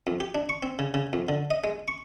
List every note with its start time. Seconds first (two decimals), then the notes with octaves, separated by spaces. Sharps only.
0.07 F2
0.20 G4
0.35 D4
0.49 C#6
0.63 C4
0.79 C#3
0.94 C#3
1.13 F2
1.29 D3
1.51 D#5
1.64 G#3
1.88 C#6